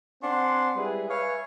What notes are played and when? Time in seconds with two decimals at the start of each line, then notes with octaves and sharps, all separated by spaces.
0.23 C4 D4 F#5 G#5 C6
0.76 G3 G#3 E4 G#4 B4
1.10 B4 C#5 E5 F5 G#5